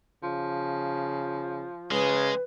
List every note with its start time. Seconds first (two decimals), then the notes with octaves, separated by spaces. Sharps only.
0.23 C#3 F3
1.91 C#3 G#3 B4